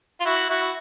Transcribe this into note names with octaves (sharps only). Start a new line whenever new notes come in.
F4
E4 F#4
E4 F#4